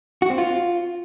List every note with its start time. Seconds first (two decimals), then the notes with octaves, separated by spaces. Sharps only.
0.22 F#4
0.30 C4
0.38 F4